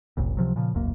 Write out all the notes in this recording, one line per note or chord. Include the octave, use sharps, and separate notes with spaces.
F#1 C2 A#2
C#2 C3 F3 F#3
A#2 C#3 F3
E1 C2 F#2 A#3